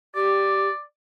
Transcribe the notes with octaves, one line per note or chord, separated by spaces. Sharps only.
G4 D5